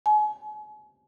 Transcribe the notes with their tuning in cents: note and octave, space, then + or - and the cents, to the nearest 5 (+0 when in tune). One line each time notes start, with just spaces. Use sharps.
G#5 +40